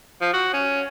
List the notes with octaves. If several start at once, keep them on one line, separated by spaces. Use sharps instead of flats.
F3
F#4
C#4